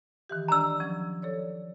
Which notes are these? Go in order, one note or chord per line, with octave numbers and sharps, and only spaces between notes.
D#3 E3 G4
D#3 D4 D5 A#5 E6
F3 F#3 C#4
A4 C#5 D5